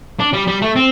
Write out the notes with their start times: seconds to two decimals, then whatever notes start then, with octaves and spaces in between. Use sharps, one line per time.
0.19 D4
0.33 G3
0.47 G3
0.62 A3
0.76 C4